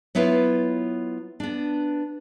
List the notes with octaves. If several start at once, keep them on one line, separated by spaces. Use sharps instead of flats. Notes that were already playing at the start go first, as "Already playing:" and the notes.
F#3 B3 E4 F4 B4 C#5
B3 D4